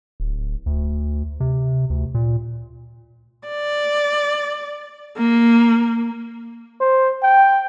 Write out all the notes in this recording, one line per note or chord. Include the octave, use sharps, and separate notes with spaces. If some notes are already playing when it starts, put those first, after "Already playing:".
D1
D2
C3
D2
A#2
D5
A#3
C5
G5